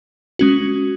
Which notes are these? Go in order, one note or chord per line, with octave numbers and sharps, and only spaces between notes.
G#3 C#4 F#4